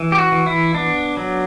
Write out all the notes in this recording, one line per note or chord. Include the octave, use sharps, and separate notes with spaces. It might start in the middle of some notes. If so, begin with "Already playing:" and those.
Already playing: E3
G4
F#4
E3
E4
B3 D4
F#3